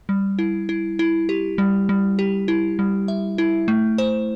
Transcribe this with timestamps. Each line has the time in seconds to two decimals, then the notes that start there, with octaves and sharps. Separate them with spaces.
0.09 G3
0.39 E4
0.69 E4
0.99 E4
1.29 G4
1.58 G3
1.89 G3
2.19 G4
2.48 E4
2.79 G3
3.08 E5
3.38 E4
3.68 A3
3.98 C5